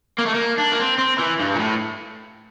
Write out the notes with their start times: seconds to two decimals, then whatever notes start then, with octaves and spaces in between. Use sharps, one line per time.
0.19 A#3
0.26 A3
0.34 A#3
0.58 D4
0.73 A#3
0.80 C4
0.99 C4
1.19 E3
1.40 G2
1.54 A#2
1.59 A2